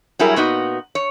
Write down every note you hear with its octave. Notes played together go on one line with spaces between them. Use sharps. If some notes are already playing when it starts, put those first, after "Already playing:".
F#3 G3 E4 G#4 A#4
A#2 B3 D#4 F#4
C#5